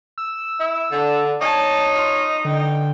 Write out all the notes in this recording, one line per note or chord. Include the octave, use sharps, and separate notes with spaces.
E6
E4
D3 D4
D#4 C#5 A5
F4
D3 G5